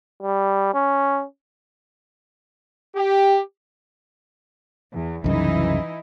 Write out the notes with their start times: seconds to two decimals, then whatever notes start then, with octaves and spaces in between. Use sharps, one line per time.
0.23 G3
0.74 C#4
2.95 G4
4.93 E2
5.24 C2 F#2 C#3 E3 D#4 E4